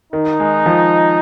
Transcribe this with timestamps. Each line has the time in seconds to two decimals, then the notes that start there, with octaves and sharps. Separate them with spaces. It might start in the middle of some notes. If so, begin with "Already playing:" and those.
0.12 D#3 D#4
0.40 G#3
0.66 F3